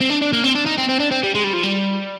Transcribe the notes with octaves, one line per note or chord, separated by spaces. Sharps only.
C4
D4
D4
A#3
C4
D4
D#4
C4
C4
D4
C4
G3
G#3
G3
F3
G3